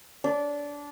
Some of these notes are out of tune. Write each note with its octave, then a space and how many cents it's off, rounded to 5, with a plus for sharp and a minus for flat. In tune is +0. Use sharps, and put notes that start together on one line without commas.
D4 -20